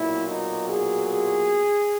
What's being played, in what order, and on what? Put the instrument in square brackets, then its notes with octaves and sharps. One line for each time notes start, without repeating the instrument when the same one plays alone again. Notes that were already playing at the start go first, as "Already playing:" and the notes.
Already playing: [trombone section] B1 A#2 F#3 E4
D#4
G#4
G#4